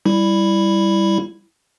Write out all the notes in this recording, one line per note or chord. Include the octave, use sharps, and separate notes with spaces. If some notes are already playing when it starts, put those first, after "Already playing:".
G3 E4